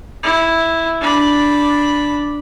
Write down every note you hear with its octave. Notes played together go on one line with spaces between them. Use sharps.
E4
D4 B5